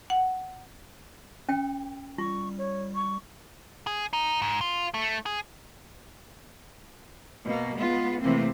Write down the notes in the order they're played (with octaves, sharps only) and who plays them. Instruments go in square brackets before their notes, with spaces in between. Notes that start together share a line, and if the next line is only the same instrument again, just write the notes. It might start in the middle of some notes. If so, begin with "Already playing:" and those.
[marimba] F#5
[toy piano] C#4 G5
[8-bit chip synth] G3 [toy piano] F4 [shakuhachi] C#6
[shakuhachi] C#5
C#6
[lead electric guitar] G#4
D#4
G#2
F4
A3
G#4
[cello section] B2 A#3
G#3 B3 F4
C3 E3 A3 A#3 C4